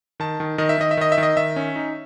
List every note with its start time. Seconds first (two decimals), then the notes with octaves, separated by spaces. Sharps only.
0.20 D#3 A5
0.40 D#3
0.58 D#3 D#5
0.69 E5
0.78 D#3 D#5
0.91 E5
0.97 D#3 D#5
1.12 E5
1.18 D#3
1.23 D#5
1.37 D#3 E5
1.56 C#4
1.76 D#4